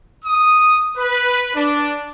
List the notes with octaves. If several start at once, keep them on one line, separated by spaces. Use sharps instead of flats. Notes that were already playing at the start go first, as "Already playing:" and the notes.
D#6
B4
D4